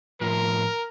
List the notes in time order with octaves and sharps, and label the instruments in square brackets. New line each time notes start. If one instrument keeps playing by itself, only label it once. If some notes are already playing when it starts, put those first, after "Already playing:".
[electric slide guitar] A2 F3 [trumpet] A#4